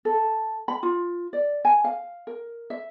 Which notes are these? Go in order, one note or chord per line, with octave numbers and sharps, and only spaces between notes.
A4
B5
F4
D5
G#5
F5
A#4
E5